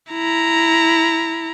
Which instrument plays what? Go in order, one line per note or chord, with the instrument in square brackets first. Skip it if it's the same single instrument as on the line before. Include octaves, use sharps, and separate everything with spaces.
[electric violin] E4 A#5